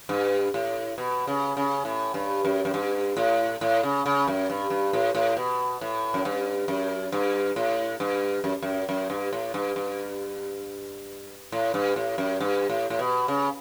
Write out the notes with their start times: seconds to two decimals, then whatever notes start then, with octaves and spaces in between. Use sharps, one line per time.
0.09 G2
0.54 A2
0.98 B2
1.27 C#3
1.57 C#3
1.85 A2
2.14 G2
2.45 F#2
2.65 F#2
2.74 G2
3.17 A2
3.61 A2
3.83 C#3
4.06 C#3
4.28 F#2
4.50 G2
4.70 G2
4.93 A2
5.15 A2
5.37 B2
5.81 A2
6.14 F#2
6.25 G2
6.68 F#2
7.12 G2
7.56 A2
8.00 G2
8.44 F#2
8.62 F#2
8.89 F#2
9.10 G2
9.33 A2
9.54 G2
9.76 G2
11.52 A2
11.74 G2
11.96 A2
12.18 F#2
12.40 G2
12.70 A2
12.90 A2
12.99 B2
13.28 C#3